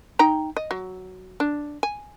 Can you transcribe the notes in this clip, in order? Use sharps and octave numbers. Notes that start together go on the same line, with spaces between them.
D#4 G5 A#5
D#5
F#3
D4
G#5